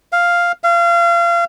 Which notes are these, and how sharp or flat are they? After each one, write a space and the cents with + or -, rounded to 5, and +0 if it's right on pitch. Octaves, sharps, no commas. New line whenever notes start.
F5 +0
F5 -30